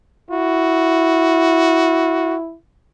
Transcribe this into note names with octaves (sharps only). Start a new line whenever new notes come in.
E4 F#4